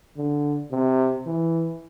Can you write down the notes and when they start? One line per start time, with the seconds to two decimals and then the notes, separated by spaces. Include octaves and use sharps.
0.17 D3
0.71 C3
1.26 E3